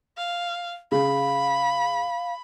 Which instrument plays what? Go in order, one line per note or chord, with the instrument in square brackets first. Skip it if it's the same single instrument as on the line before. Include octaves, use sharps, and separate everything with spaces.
[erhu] F5
[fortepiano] C#3 [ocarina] F5 [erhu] B5